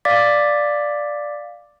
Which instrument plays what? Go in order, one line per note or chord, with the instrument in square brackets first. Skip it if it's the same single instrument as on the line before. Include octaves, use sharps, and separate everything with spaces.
[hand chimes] D5 F5 D6 A6 B6